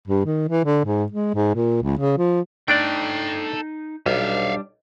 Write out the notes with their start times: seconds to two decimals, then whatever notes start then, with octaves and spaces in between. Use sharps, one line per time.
0.08 G2
0.26 D#3
0.49 E3
0.65 D3
0.85 G#2
1.12 G#3
1.34 G#2
1.55 A#2
1.83 C#2
1.98 C#3
2.18 F3
2.68 A3 D4 D#4 A4 D5 G5
4.06 B1 G3 D4 E5 F5